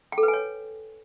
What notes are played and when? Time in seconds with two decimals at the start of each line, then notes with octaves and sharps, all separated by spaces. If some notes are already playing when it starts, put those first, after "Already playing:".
0.12 G5
0.18 A4
0.23 B4
0.28 G#5
0.34 C#5